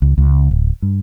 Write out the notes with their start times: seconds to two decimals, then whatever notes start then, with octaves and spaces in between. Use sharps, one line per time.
0.02 C#2
0.18 C#2
0.51 D1
0.82 G2